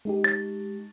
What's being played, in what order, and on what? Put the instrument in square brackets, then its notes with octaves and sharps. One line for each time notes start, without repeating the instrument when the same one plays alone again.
[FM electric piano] G#3 D#4 G4
[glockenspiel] A6